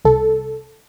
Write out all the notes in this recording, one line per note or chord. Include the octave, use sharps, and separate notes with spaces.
C2 A4